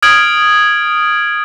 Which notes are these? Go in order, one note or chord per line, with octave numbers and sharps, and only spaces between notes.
D#6 F6 G#6 D7 F#7